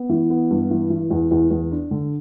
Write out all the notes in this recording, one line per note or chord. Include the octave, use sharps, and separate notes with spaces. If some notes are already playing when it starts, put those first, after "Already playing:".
Already playing: B3
E3
B3
G2
E3
E3
E2
E2
E2
D4
D3